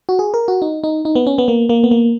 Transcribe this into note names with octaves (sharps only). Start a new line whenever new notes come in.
F#4
G#4
A#4
F#4
D#4
D#4
D#4
B3
C#4
B3
A#3
A#3
B3
A#3